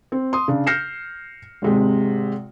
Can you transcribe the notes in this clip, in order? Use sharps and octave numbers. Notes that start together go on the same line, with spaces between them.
C4
C6 D#6
C#3 D4
F6 G6 A#6 C7 C#7 E7
G#1 C3 G#3